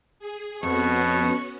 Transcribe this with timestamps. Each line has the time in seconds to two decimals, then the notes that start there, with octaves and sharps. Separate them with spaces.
0.19 G#4
0.63 F2 B2 B3 C#4 F#4 C#6